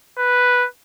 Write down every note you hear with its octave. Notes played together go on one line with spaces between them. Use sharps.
B4